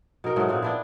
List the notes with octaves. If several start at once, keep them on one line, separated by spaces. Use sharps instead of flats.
B2 D#4 A#4 G5
G#2 F#3 G#3 A3
A#2 G#3 C4
B3 D4 E4